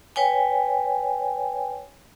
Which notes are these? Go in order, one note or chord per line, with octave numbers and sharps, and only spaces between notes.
B4 C#5 G5 G#5